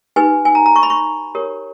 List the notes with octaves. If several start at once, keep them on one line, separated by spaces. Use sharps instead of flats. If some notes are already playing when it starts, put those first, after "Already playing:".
D#4 G4 B4 G#5
G#5
A#5
A#5
C#6
B5
C#6
G4 A#4 C#5